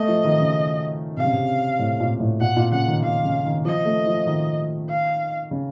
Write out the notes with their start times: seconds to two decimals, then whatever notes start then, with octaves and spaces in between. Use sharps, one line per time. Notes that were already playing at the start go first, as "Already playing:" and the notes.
Already playing: A3 D#5
0.08 F3
0.25 D#3
0.40 C#3
1.17 C3 F5
1.25 C#3
1.33 C3
1.79 A2
2.00 A#2
2.20 A2
2.41 A#2 F#5
2.57 A#2
2.72 C#3 F#5
2.87 D#3
3.03 D#3 F5
3.24 C#3
3.45 D#3
3.65 F3 D#5
3.85 A3
4.07 F3
4.27 D#3
4.89 F5
5.51 C#3